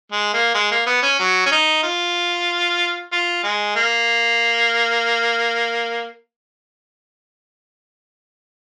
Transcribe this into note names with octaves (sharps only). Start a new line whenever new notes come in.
G#3
A#3
G#3
A#3
B3
C#4
F#3
C#4
D#4
F4
F4
G#3
A#3